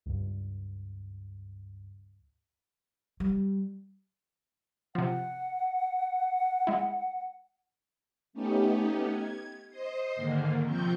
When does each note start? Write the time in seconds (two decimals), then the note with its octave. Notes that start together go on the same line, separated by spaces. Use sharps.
0.06 C#2 G2
3.20 G3
4.95 C3 F3 F#5
6.67 G#3 E4
8.33 A3 B3 C#4 D#4 G4
9.09 G#6
9.69 C5 D#5 C7
10.16 G#2 D3 D#3 A#3
10.64 C3 F3 C4 C#6 G6